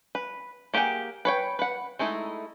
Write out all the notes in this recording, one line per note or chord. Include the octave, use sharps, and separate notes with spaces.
B4
A#3 G4 G#4 F#5 G5
B4 C#5 G5
B4 F#5
G#3 A3 D#4 E4